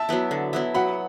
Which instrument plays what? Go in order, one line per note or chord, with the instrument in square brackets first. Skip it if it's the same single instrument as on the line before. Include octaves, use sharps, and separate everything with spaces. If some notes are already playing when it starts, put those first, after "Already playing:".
Already playing: [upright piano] E5 A5
[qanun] F#3 B3 E4
D3
F#3 B3 E4
[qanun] F#3 [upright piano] F#5 B5